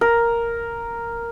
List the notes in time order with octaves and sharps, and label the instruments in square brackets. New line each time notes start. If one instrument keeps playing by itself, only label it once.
[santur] A#4